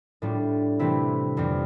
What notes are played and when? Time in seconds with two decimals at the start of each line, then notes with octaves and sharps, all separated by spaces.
0.22 A2 G3 D4 F4
0.79 C3 E3 A3 C4 E4
1.37 F2 E3 G3 C4 F4